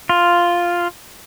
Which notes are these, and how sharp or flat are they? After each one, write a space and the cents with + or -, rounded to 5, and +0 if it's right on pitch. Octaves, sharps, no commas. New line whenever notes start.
F4 +0